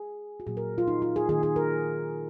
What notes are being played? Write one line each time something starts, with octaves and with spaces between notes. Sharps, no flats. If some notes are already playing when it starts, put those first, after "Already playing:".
Already playing: G#4
F#4
A#2 F#3 A#3 G#4
A#4
F4
D#4
F4
G#4
D#3 A#3 G#4
G#4
A#4